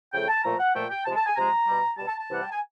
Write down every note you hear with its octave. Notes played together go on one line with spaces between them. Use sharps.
C#3 F3 A3 G5
A5
A#2 F3 A3 A#5
F#5
A#2 F3 A3 G5
G5
C3 F3 G#3 A5
A5
G#5
C3 F3 G#3 A#5
B2 G3
B2 G3 A5
A5
A5
C3 E3 G3 F#5
G5
G#5